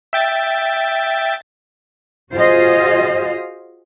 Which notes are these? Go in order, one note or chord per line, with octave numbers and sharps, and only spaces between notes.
E5 G5 A6
F4 F#4 G#4 C5 D#5 F5